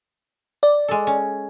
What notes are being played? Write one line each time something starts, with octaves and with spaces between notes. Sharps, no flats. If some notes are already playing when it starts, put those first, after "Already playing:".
D5
G#3 A4
C#4